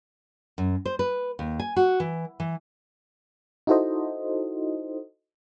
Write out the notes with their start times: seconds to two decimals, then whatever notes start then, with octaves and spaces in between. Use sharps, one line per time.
0.58 F#2
0.86 C5
0.99 B4
1.39 D#2
1.60 G#5
1.76 F#4
2.00 E3
2.40 E3
3.67 D#4 E4 F#4 A4 C5 D#5